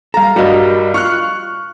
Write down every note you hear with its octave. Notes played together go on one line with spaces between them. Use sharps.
G3 A4 F5 A#5
G2 G3 F#4 A#4 D#5
F4 C#6 F6 F#6